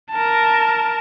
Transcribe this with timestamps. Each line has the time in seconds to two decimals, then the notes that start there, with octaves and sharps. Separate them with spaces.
0.11 A#4 A5